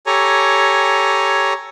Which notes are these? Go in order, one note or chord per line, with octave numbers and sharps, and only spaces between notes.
G4 A4 C#5 G#5 A#5